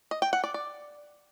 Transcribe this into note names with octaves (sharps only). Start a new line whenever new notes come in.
D#5
G5
F#5
D5
D5